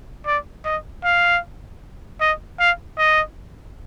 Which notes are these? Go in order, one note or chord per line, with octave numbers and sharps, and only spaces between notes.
D5
D#5
F5
D#5
F5
D#5